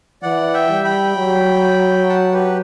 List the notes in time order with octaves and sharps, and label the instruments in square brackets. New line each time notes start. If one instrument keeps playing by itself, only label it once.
[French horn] E3 [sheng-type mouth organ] D5 F#5
[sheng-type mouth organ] E5 G5
[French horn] G3
[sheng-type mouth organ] G5 B5
[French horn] F#3
[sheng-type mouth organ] F#5 A5
G4 B4